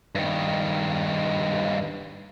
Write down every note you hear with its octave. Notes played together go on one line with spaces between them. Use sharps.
G2 D#3